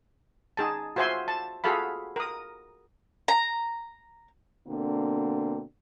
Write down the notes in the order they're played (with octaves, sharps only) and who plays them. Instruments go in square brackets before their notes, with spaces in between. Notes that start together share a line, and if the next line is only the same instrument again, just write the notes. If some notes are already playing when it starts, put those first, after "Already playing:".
[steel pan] D#4 G#4 A5
F4 F#4 C5 E5 G#5 C6
A5
F4 F#4 G#4 A4 F5 B5
A#4 D#6
[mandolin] A#5
[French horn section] B2 D3 A#3 C4 D4